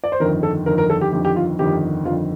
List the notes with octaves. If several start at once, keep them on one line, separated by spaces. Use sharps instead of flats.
D5
C5
G1 F2 D#3 A#4
A4
G1 F2 D#3 A#4
A#4
A4
G4
G1 F2 D#3 G4
G4
F4
G1 F2 D#3 G4
G1 F2 D#3 F4